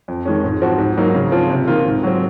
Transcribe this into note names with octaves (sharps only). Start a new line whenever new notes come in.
F2
D#3 G#3 C#4
G#2
F3 C4 F#4
G#2
F#3 A#3 D#4
C#3
F3 C4 F4
C3
D#3 A#3 F4
G#2
F#3 C4